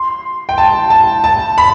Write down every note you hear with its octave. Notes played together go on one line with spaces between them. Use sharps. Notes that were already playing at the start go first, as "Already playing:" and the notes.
Already playing: C6
G5
A5
A5
A5
B5